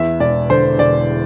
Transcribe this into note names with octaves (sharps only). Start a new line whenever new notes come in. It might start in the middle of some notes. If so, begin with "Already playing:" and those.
Already playing: E2 E5
E1 D5
D3 C5
E1 D5